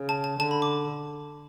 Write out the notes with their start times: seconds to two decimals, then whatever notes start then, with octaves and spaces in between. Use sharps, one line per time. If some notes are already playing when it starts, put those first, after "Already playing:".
Already playing: C#3
0.09 A5
0.24 A5
0.39 D3 A5
0.51 B5
0.62 D6